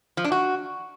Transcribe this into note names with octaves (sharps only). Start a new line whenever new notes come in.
F3
D4
F#4